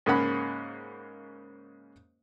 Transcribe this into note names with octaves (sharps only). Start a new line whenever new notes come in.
G#2 C#3 A#3 C#4 F#5 B5